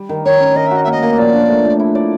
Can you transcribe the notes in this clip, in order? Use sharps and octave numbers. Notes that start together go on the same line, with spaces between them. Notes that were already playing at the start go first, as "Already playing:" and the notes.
Already playing: G3
D#3
D#3 C#5
C#4
A#4 D#5
E5
F#4
D#5
E5
A#3 D#5
A#3
F3 D5
D4
A3
F3
E4
D5